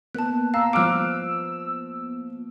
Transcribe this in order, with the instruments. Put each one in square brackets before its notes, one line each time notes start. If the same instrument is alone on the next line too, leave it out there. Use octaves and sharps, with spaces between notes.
[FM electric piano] A#3 B3 [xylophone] A5 F#6
[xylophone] F5 [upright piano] A#5 [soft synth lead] E6
[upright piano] F3 F6 D7 [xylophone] D6 F#6